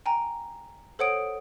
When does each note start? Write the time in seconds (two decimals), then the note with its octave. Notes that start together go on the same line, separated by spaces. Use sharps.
0.06 G5 G#5 A#5
0.99 A4 C5 C#5 F#5 D#6 D7